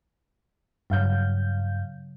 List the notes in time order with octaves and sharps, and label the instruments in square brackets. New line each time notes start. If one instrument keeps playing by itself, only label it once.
[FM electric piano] G2 F5 G6 [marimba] C#3 F#3